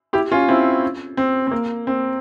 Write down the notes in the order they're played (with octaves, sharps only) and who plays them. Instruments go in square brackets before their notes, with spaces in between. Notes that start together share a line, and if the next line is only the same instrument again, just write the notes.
[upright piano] E4 G4
C#4 F4
C4 E4
C4
C4
A#3
C4